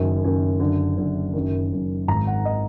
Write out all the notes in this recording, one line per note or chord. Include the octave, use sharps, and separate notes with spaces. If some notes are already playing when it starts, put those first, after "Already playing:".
Already playing: F#1 F#2 D#3
F#1 F#2 D#3
F#1 F#2 D3
F#1 F#2 D3
F#1 F#2 D#3
F#1 F#2 D#3
G#1 G#2 D#3 A#5
F#5
D#3 D#5